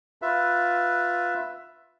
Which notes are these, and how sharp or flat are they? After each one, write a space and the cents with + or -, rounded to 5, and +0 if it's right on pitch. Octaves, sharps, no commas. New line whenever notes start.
F4 +15 B4 +0 E5 +10